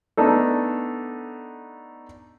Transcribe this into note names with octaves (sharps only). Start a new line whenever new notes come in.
A3 B3 D4 D#4 A4